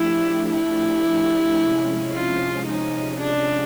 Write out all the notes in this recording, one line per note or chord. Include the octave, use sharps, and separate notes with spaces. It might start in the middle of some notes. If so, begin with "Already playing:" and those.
Already playing: F3 A3 D4 E4 G4
E4
C3 F3 G#3 C#4
F4
D#4
D4